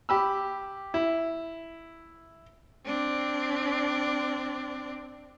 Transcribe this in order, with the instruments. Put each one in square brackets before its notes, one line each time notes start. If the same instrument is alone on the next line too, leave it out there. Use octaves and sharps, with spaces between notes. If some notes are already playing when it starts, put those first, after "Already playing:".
[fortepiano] G4 B5 E6
E4
[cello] C4 D4